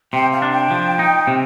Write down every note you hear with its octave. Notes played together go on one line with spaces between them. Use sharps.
C3 G5
F5
D4
G5
F3
D#4
C3